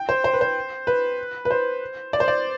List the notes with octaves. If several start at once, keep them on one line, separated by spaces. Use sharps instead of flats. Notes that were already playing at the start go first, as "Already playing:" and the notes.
Already playing: G5
C5
C5
B4
C5
B4
B4
C5
D5
C5
D5